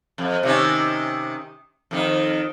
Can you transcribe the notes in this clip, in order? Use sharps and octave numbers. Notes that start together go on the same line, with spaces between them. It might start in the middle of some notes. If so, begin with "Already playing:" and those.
F2
C3 D#3 C#4
F2 D#3